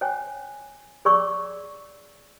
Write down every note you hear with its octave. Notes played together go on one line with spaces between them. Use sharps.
C5 C#5 G5 G#5
G#4 C#5 D5 B5 C#6 E6